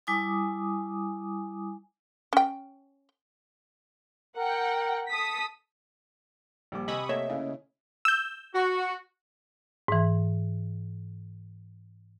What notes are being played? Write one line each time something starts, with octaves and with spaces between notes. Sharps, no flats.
G3 E4 G#5 D6 D#6
C#4 G5
A#4 F#5 G5
A4 D#6 B6
A#1 G3 D6
C3 D#5 G#5 B5 C#6 D#6 E6
A3 A#3 C#5 D#5 E5
C#3 E4
E6 G6
F#4
G#2 E3